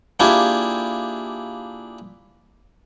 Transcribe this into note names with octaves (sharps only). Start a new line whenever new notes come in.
A#3 D4 E4 F4 G4 G#4